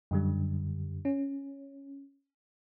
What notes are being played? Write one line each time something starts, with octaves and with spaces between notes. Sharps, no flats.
F#2 D3 G3
C#4